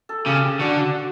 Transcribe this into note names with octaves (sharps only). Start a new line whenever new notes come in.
A4
C#3 G4
D3 F#4